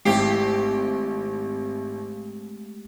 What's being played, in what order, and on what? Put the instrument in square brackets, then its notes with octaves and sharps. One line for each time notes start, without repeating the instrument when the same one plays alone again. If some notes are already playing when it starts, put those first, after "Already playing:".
[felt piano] G#1 E4 C7 [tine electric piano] G#3 A3 [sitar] G4